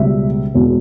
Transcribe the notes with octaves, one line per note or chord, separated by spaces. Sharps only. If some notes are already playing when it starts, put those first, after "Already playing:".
Already playing: C#2 B2 G3 B3 E5
E1 E2 B2